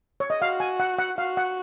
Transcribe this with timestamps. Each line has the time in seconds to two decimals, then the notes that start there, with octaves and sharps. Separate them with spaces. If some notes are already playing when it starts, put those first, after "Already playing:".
0.20 C#5
0.30 D#5
0.41 F#4 F5
0.60 G#5
0.80 F#5
0.99 F#5
1.18 F#4 F5
1.37 F#5